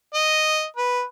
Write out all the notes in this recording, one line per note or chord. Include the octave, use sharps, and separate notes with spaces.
D#5
B4